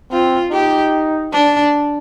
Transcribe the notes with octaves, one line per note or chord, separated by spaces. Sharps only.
C4 F4
D#4 G4
D4